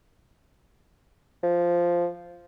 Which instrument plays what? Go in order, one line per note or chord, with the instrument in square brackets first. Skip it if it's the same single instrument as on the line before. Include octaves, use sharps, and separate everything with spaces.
[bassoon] F3